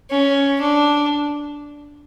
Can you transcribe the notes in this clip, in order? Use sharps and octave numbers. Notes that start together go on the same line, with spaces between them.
C#4
D4